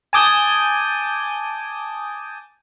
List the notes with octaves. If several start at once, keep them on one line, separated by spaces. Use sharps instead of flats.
G#5 A5 D6 D#6 G6